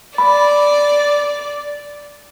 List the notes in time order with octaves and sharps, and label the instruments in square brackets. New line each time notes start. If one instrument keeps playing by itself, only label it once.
[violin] D5 [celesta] B5